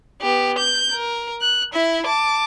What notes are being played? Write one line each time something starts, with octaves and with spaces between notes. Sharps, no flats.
B3 G4
G6
A#4
F#6
E4 E5
A5 D6